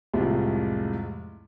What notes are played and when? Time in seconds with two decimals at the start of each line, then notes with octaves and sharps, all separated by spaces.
0.13 C2 F2 A2 F3 G3 G#3